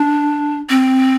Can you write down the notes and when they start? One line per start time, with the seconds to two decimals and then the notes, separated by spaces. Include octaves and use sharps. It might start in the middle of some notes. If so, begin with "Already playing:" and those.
Already playing: D4
0.69 C4